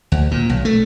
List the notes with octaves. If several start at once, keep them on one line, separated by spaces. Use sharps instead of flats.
D2
A#2
B1
A3